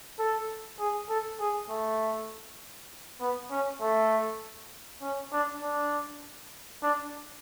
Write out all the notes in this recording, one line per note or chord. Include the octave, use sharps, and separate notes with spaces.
A4
G#4
A4
G#4
A3
B3
C#4
A3
C#4
D4
D4
D4